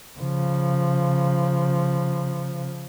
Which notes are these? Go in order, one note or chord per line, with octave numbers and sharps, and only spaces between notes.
C#3 F3